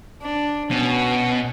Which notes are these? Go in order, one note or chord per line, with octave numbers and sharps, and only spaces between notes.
D4
B2 C#4